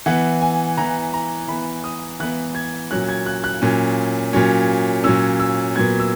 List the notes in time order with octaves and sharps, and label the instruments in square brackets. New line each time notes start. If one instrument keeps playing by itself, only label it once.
[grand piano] E3 B3 F#5
G#5
E3 B3 A#5
A#5
E3 B3 B5
D#6
E3 B3 F#6
G#6
A#2 F#3 C#4 F#6
G#6
F#6
F#6
A#2 F#3 C#4
A#2 F#3 C#4
A#2 F#3 C#4 E6
E6
A#2 F#3 B3 G#6
E6